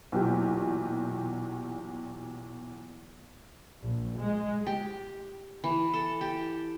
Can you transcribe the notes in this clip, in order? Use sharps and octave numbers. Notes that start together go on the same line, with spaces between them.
B1 E2 A#2 G4
A#1
G#3
G4
E3
A4
G4